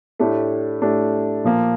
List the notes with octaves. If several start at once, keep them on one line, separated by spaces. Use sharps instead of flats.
A2 A3 D4 G4
A2 A3 D4 G4
A#2 F3 A#3